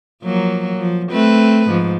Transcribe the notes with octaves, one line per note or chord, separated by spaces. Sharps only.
F3 F#3 A#3
F3
A3 C4 B4
G#2 F3